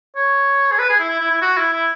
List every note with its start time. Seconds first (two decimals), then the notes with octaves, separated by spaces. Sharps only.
0.16 C#5
0.72 G#4
0.79 B4
0.89 G#4
0.99 E4
1.10 E4
1.20 E4
1.31 E4
1.42 F#4
1.57 E4
1.73 E4